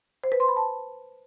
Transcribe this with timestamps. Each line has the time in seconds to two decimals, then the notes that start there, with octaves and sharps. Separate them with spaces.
0.24 C5
0.32 B4
0.40 C6
0.48 B5
0.56 A5